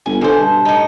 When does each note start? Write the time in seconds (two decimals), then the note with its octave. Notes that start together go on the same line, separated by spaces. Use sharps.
0.06 G1 G#5
0.21 B2 D3 C5 G#5
0.40 G2 A5
0.65 A2 D#4